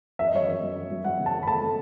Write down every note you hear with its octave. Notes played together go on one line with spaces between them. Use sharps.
F#2 E5
D#5
F#3 C#5
F#2 D#5
F#3
F#2
F#3
F#3 F#5
C#3
A5
F#2
B5
A3 A5
A3